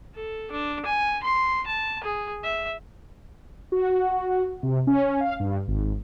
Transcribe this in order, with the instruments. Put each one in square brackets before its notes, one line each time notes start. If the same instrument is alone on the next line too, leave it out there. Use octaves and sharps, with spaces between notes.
[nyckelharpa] A4
D4
G#5
C6
A5
G#4
E5
[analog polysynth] F#4
C3
C#4
F5
G2
G#1